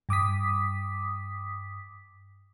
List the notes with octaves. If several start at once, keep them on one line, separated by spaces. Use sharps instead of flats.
G2 D6 D#6 B6